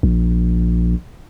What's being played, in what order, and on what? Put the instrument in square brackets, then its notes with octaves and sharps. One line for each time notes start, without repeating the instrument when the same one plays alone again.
[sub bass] A#1